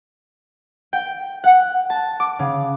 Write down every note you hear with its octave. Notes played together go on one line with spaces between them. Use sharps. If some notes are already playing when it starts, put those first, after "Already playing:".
G5
F#5
A5
D6
C#3